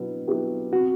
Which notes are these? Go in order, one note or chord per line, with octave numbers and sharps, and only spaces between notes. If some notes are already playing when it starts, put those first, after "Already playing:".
Already playing: B2 F#3 B3 D4 E4
F#3 B3 E4 G4
C3 F#4